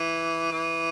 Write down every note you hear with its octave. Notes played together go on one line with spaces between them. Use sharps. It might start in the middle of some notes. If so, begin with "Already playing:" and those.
Already playing: E3
E3